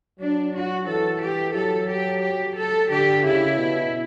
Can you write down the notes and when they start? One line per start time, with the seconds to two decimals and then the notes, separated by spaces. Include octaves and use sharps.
0.19 F#3 D4
0.54 F#4
0.87 E3 A4
1.21 G4
1.55 F#3 A4
1.89 G4
2.22 G4
2.56 A4
2.90 D3 G4
3.24 C#3 E4
3.57 B2